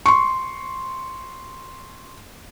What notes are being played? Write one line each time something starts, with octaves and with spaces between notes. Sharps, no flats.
C6 C#6